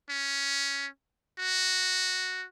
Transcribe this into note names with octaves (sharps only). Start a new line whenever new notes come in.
C#4
F#4